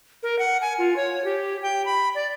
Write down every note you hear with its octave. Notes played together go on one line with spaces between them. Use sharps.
A#4
F#5
G#5
F4
C#5
G4
G5
B5
D5